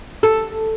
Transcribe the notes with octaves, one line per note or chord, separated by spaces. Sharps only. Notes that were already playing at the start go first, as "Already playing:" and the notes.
A4